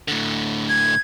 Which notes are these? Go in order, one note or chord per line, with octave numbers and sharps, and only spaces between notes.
A2 D3
G#6